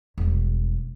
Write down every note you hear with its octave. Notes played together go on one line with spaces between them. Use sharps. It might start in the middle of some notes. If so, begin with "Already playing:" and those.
E1 G3